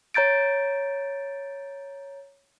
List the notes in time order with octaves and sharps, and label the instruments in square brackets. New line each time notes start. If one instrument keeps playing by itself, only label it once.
[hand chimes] C#5 A#5 G6 A6 D7